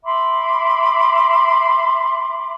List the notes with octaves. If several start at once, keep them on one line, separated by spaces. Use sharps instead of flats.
E5 B5 C6 D6